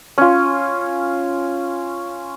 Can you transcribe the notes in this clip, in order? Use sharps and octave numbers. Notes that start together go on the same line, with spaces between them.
C#4 F4